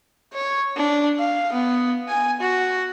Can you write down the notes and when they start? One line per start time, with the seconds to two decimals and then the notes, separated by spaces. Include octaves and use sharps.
0.33 C#5
0.76 D4
1.19 F5
1.53 B3
2.08 G#5
2.40 F#4